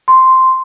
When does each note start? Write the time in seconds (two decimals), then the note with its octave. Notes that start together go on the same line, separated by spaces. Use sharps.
0.08 C6